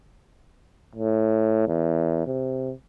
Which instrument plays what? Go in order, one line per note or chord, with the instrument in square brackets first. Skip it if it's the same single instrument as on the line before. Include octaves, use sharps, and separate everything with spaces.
[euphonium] A2
E2
C3